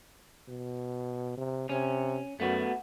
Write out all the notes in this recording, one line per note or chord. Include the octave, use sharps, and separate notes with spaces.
B2
C3
C3 C#4
F#2 A3 B3 F#4